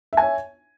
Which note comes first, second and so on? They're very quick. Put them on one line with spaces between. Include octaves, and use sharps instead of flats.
E5 G#5 C#5